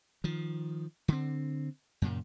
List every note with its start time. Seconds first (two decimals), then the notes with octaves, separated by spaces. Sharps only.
0.24 D#3 F3
1.08 D3 C4
2.02 F#2 A#2 C#3